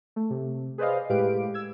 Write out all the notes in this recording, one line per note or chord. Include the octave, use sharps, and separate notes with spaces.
A3
C3
G#4 B4 C5 D5 D#5 F5
A2 G#3 G4 B4 F5 D7
E6 G#6